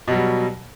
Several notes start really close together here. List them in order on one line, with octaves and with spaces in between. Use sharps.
B2 F#3 G3